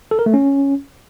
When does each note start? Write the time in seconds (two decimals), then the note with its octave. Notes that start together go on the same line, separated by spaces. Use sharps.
0.11 A4
0.19 A#4
0.26 A3
0.34 C#4